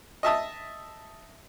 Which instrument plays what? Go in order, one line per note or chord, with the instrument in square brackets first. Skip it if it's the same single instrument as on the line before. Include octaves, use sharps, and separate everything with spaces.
[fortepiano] D#5 E5 A5 D#6